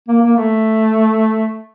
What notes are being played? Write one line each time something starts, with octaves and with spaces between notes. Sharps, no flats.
A#3
A#3
A3